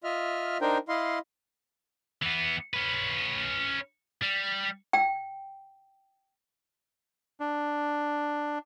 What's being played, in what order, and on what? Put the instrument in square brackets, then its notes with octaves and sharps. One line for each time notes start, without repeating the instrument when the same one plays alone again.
[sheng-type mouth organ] F4 D#5 E5 F6
D4 D#4 A#4 C5 G5
E4 D#5 F5 C6
[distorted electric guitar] E3 B3
C#4 B4
G3
[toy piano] G5
[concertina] D4